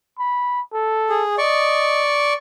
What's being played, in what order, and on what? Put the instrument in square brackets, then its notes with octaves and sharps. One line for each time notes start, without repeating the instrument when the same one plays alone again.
[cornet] B5
A4
[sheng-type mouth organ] G#4
[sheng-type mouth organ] D5 C#6 [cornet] D#5